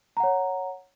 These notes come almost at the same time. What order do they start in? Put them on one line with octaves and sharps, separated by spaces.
A#5 F#5 C#5